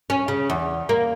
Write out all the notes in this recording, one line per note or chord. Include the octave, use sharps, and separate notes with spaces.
C#4
C#3
E2
A#3